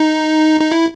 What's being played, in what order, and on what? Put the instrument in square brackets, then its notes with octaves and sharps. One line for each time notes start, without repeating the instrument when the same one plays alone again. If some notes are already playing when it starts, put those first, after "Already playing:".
Already playing: [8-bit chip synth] D#4
D#4
E4